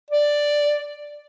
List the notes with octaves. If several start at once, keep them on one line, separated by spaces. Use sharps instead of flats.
D5